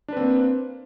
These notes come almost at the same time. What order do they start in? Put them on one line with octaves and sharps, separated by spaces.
D4 B4 C4 A#3